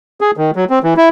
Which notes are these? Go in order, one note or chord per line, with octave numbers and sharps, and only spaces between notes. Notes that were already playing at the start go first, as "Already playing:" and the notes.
G#4
D#3
F#3
C4
E3
E4